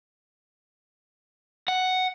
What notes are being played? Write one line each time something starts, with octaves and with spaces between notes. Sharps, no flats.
F#5